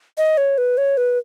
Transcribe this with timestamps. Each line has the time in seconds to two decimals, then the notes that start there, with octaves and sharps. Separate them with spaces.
0.18 D#5
0.37 C#5
0.58 B4
0.78 C#5
0.97 B4